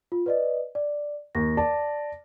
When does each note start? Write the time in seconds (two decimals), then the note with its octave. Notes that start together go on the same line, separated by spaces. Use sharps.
0.12 F4
0.26 B4 D5 D#5
0.75 D5
1.35 D#2 A#6
1.57 D5 A5